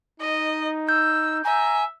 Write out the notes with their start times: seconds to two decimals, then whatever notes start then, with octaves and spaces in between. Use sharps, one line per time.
0.20 D#4 D#5
0.89 E6 G6
1.45 E5 G#5 A#5